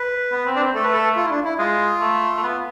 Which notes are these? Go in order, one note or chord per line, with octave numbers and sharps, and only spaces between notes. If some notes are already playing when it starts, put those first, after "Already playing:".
Already playing: B4
B3
C4
D4
C4
A3 A4
B4
A4
F4
E4
D4
E4
G#3 F4
A3
A3
B3